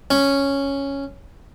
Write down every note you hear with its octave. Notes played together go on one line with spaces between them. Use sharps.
C#4